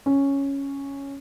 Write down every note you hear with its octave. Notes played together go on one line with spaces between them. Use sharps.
C#4